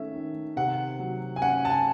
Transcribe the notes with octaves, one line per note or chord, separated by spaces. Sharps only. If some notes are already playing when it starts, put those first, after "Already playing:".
Already playing: D#3 A3 C#4 E5
D#3
C3 F#5
F#3
G#5
C#4 F#5
A5
G#5